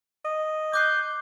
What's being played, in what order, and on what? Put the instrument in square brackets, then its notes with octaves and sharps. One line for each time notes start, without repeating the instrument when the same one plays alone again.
[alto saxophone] D#5
[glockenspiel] D6 F#6 C7 [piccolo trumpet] G6